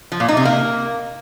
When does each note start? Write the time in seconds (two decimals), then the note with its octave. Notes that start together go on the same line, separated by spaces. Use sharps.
0.12 F3
0.20 A#2
0.28 D#4
0.37 C3
0.45 A#3